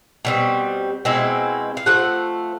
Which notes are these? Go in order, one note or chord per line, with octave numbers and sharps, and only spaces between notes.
B2 G3 C4
B2 G#3 C4 E4
F5
F3 A3 C4 F#5